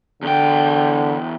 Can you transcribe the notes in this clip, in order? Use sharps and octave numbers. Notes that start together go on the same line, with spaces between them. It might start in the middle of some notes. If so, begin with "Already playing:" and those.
E2 D3 G5